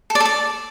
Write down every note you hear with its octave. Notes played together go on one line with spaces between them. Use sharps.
A4
D5
A4
D5